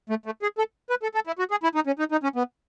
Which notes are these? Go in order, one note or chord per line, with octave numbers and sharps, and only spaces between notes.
A3
A3
G#4
A4
B4
A4
A4
E4
F#4
G#4
E4
D#4
C#4
D#4
D#4
C#4
B3